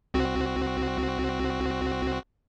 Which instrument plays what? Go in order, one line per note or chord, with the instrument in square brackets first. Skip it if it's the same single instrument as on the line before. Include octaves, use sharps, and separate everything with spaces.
[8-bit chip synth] C2 C4 F#4